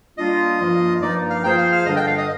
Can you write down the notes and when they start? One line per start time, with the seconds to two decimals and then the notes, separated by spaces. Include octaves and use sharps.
0.18 G3 A#3 D4 F4 D#5
0.60 G2 F3 A#3 F4
1.01 G2 F3 A#3 D#4 D5
1.30 F5
1.44 F3 A#3 F4 G#4 C5 G5
1.58 F5
1.72 F5
1.86 G2 D3 G3 D4 D#5
1.96 G5
2.07 F5
2.18 D#5